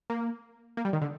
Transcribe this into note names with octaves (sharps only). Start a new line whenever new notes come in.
A#3
A#3
G3
D#3
D3